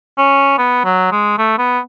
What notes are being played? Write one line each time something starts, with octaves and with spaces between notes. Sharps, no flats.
C#4
B3
F#3
G#3
A3
B3